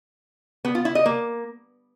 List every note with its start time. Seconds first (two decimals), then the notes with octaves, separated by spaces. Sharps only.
0.65 B3
0.75 F4
0.85 E4
0.95 D#5
1.06 A#3